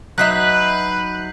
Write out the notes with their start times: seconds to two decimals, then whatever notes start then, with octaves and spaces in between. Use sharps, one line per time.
0.18 F#3 D#4 B4 E5 F#6 G6 B6 C7